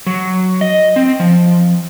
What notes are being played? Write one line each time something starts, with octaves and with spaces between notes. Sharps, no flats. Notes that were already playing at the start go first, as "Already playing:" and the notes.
F#3
D#5
C4
F3